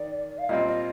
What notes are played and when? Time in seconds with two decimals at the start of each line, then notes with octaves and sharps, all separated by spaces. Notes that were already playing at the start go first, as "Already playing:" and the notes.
Already playing: D#3 D5
0.38 F5
0.49 A#2 G3 C4 F4 D#5
0.68 D#5